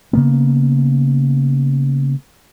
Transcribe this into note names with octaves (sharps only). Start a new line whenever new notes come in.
C#3 A#3 B3